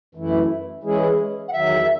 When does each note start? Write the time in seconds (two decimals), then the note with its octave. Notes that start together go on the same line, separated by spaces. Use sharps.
0.15 F#2 E3 A3 E4
0.83 E3 G#3 C#4 E4 G#4
1.48 F#5
1.52 E2 D#3 F#3 E5